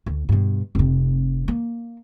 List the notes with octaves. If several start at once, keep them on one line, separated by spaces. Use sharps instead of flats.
D2
G2 B2
F1 C3
A#3